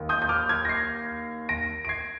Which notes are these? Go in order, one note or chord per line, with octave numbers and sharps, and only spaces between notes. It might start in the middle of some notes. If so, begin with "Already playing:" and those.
Already playing: D#2 D#3
D#6 G6
G6
D6 F6
F6 G#6
A#6
G#6 C7
A#6 D7
D7
G#6 C7